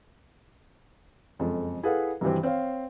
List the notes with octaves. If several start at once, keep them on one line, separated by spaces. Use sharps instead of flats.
F#1 F2 G#3 A4
E4 G#4 A4 B4 F5 F#5
G2 C3 D#3 E3 F#3 C4
C4 C#5 F5